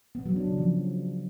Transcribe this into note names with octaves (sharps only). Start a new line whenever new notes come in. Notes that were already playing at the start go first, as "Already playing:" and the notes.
B3
F#3
D4
C#3
F3